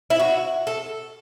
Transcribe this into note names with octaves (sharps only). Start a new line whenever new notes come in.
E4
F#4
A4